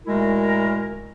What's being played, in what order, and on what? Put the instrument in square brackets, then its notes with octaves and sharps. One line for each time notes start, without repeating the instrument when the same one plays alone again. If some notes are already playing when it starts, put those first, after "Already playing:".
[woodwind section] A#2 G#3 A3 E4 F#4 A#4